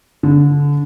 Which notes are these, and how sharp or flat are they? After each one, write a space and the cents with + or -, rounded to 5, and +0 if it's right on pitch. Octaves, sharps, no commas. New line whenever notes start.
D3 -30